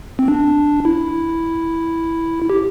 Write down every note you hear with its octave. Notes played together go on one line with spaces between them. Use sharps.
C4
D4
E4
G4